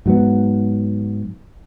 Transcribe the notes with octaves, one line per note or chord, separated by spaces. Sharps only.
G#2 F#3 B3